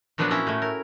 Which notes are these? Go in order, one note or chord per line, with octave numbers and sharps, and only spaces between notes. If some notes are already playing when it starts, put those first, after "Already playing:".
A#2 F3 F#3 B3 D4 F#4
C#4 E4 A#5
A2 A3
A#4